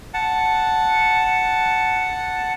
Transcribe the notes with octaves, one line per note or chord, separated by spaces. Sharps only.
F#5 A5